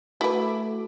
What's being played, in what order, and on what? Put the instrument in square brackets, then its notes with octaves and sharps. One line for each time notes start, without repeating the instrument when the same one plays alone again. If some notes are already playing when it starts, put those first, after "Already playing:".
[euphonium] A3 [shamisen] E4 B4 [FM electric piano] F#4 A4 D6